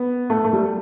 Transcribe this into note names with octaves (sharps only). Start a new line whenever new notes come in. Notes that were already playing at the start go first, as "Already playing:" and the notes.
Already playing: B3
A3
A3
G3